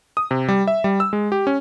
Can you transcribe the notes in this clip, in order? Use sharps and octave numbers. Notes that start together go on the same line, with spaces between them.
D#6
C3
G3
E5
G3
E6
G#3
G4
C#4